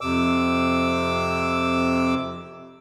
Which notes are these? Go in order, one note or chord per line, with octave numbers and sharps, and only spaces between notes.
F2 C3 D6 E6